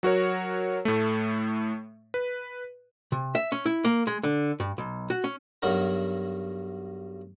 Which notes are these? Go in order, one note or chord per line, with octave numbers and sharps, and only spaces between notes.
F#3 F#4 A#4 C#5
A2 A3
B4
C3
E5
C#4
E4
A#3
G#3
D3
G2
B1
F#4
C#4
B1 G2 F#3 D#4 F#4 A#4